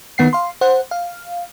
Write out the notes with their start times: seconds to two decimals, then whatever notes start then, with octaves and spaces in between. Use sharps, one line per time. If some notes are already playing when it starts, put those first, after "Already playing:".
0.18 D#3 B3 F#5 C7
0.33 F5 C6
0.61 C5 F#5
0.91 F5